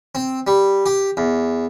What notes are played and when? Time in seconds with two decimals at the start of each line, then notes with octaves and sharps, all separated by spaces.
0.15 C4
0.47 G3
0.86 G4
1.17 E2